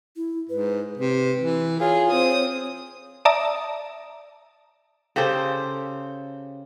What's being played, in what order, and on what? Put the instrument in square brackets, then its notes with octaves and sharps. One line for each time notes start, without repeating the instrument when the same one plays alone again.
[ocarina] E4
[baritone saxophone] G#2 [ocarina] B4
[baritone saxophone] C3 [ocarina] B4
[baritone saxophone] E3
[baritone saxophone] F4 [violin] G#4 [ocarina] C#5
[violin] C4 D#6
[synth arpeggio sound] D5 E5 A5 A#5 D#6
[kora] C#3 G4 A4 C5